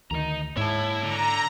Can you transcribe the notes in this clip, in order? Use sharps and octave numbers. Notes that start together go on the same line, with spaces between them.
D2 D#3 D#5 A#5
G#2 E4 C#5 A5
D3 A#5